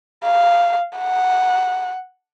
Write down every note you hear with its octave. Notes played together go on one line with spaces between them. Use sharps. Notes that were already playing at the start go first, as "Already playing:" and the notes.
F5
F#5